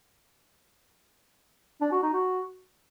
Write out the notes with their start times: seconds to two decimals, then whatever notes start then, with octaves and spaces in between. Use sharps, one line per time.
1.81 D4
1.92 F#4
2.03 D#4
2.13 F#4